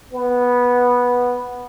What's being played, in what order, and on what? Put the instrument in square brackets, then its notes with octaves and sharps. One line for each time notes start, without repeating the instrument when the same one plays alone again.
[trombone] B3